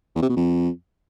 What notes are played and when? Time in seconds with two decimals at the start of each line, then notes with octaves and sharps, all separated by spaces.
0.15 E2
0.22 C3
0.29 B2
0.36 F2